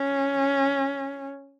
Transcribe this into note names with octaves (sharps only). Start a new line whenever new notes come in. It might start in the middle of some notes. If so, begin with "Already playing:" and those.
Already playing: C#4